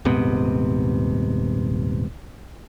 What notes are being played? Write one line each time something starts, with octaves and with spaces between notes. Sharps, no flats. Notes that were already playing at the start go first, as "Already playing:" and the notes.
D#1 G#2 C3 B3